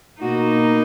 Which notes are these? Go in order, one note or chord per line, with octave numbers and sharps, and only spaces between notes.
B2 A#3 D#4 F#4